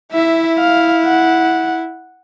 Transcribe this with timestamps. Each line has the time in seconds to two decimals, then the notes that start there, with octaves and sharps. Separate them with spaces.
0.12 E4 E5
0.59 F5
1.05 F#5